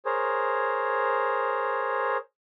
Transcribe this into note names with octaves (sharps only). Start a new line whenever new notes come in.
G#4 A#4 C5 C#5